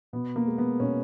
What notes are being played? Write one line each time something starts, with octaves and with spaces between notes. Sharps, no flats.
B2 B3
A#3
G#3
B3
B2 C#4